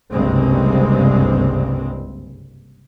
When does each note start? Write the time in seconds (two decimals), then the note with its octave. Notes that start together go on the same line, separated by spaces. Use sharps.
0.11 F#1 C2 G2 G#3 C4